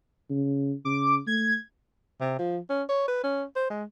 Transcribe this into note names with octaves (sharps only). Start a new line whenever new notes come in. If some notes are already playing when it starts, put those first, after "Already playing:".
C#3
C#3 D6
A3 G#6
C3
F3
C#4
C#5
B4
C#4
C5
G#3